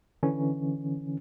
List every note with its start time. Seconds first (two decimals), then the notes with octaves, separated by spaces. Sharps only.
0.23 D3 E3 C#4